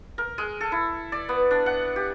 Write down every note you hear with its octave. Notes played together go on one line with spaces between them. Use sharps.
A#4
G#3
A4
E4
D5
B3
D4
F#5
G4